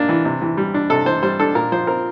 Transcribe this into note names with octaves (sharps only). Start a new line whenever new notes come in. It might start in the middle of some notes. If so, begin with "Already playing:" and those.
Already playing: A#3 D4
E3
C3
E3
G3
D4
C3 A4
E3 C5
G3 C5
D4 A4
A#2 A#4
F3 C5
C4 A#4